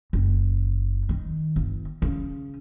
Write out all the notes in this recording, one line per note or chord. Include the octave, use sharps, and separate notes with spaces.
F#1
D#3
G1
C#3